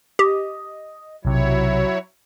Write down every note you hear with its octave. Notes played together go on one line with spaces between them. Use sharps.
G4 D#5
B1 C3 F#3 E4 C#5